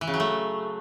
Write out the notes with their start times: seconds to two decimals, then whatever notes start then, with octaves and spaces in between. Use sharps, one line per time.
0.01 E3
0.07 C#3
0.14 F#3
0.20 A3